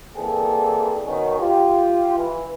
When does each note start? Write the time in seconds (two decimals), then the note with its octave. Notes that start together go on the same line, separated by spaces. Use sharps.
0.16 E3 G3 A#3 C4 G#4 A4
1.06 B2 D#3 C#4
1.39 F4 G4
2.17 E3